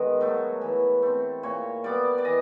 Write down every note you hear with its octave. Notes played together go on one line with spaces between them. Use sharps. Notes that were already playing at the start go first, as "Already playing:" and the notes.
Already playing: D#3 G#3 B3
F#3 A3
E3
A3 C4
A#2 C#5
G3 B3 D5
D5
E3 D#5